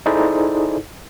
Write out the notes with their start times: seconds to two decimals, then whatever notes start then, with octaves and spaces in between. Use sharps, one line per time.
0.06 D#4 E4 G#4 A4 C5 D5